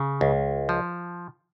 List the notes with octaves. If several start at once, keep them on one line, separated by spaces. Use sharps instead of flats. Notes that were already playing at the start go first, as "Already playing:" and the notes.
Already playing: C#3
C#2
F3